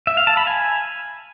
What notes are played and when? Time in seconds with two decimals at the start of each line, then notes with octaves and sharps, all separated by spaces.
0.07 E5
0.17 F5
0.27 A5
0.37 B5
0.47 G#5